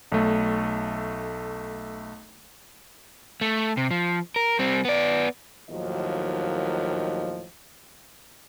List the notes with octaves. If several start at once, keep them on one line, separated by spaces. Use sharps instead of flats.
B1 A3
A3
C3
F3
A#4
G3 C4
B3 D5
D#2 A2 D#3 F3 F#3 D#5